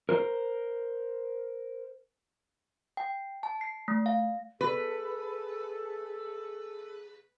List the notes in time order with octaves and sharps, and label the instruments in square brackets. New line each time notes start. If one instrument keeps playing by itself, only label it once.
[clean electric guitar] A#4 C5
[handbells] G5
A5
C7
A3
F5
[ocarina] G#4 [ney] A4 [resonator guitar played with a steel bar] B4